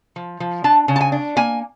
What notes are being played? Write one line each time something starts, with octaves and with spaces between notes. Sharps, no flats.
F3
F3
D4 A5
C#3
A5
G#5
D4
A#3 G#5